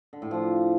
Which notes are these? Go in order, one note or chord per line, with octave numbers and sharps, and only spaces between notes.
D3
A2
F3